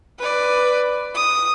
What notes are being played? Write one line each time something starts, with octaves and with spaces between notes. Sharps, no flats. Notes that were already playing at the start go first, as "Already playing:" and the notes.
B4 D5
D#6